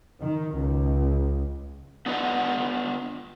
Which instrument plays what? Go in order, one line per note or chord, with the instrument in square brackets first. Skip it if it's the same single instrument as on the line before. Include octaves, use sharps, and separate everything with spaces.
[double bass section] D#3
C#2
[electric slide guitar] B3 D4 F4 B4 D#5 F#5